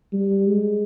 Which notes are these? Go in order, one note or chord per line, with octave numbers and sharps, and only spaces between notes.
G3
G#3